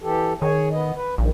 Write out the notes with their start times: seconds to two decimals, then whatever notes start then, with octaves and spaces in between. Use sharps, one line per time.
0.02 E3 G4 A4
0.42 D#3 G#4 C#5 G#5
0.71 B3 D#5
0.96 B4
1.18 A#1 G2 D#3